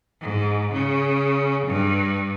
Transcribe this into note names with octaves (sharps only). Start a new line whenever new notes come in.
G#2
C#3
G2